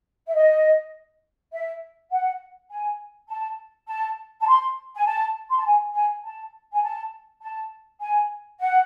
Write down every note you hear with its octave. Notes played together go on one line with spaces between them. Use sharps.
E5
D#5
E5
F#5
G#5
A5
A5
A5
C6
G#5
A5
C6
A5
G#5
G#5
A5
G#5
A5
A5
G#5
F#5